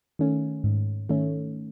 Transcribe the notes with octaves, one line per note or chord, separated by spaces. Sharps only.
D#3 A3 C#4
G#2
D#3 A3 C#4